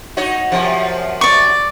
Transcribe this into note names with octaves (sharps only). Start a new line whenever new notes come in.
D#4 F#4 C#5
F#2 C3 F3
D5 C#6